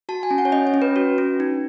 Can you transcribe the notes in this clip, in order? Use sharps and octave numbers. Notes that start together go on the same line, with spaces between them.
F#4 A5
G#5
C#4
F#5
C#5
C#4 D#5
C#5
C#4
B4
F#4
C#4
D#4